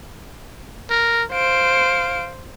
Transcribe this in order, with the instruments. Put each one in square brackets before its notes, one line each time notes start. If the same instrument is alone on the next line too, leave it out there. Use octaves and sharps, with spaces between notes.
[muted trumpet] A#4
[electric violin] C5 D7 [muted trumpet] F5